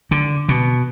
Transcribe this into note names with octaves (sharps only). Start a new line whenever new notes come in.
D3
B2